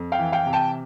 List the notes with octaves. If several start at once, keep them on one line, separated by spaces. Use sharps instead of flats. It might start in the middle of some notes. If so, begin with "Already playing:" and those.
Already playing: F2
F5 G5
E3
F5 G5
C3
G5 A5